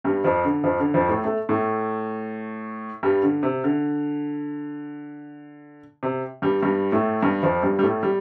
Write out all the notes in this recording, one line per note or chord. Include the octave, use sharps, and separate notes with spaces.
G2 G3
F2 F3
D3
F2 F3
D3
F2 F3
A2 A3
A3
A2 A3
G2 G3
D3
C3
D3
C3
G2 G3
G2 G3
A2 A3
G2 G3
F2 F3
G2 G3
G3
A2 A3
G3